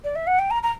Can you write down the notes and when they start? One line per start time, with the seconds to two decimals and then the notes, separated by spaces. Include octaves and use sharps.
0.04 D5
0.15 E5
0.27 F#5
0.39 G5
0.51 A#5
0.63 A#5